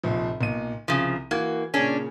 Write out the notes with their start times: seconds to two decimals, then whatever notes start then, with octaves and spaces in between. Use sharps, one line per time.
0.03 F1 A#1 F3
0.41 B1 A#2 D#7
0.88 C2 C#3 F3
1.31 E3 A#3 F#4 G#6
1.74 A#2 C#3 C#4 D4